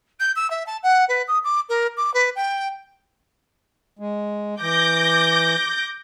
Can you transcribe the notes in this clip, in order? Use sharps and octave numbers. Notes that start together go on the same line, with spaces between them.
G6
E6
E5
A5
F#5
B4
D#6
D6
A#4
D6
B4
G5
G#3
E3 D6 G6 A#6